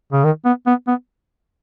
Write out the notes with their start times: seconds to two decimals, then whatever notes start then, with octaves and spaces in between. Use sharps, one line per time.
0.12 C#3
0.24 D#3
0.45 B3
0.67 B3
0.87 B3